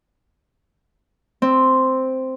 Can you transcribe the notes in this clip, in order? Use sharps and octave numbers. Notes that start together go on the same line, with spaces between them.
C4